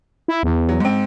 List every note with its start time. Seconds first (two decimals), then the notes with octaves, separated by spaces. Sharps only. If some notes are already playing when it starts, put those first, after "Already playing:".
0.28 E4
0.43 E2
0.69 F#3
0.80 G#2 C4